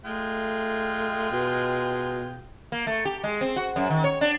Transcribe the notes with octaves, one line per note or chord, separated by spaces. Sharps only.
G#3 A3 F4 G5
B2
A#3
A3
G4
G#3
C4
F#4
F#2
D#3
C#5
D4